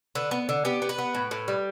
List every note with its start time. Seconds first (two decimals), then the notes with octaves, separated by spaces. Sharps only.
0.15 D3 B4
0.31 B3
0.49 D3
0.65 B3 G4
0.82 B3
0.89 B4
0.98 B3
1.15 A2
1.31 A2
1.48 G3